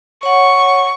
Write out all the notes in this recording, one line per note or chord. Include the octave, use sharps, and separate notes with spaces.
C#5 F#5 C#6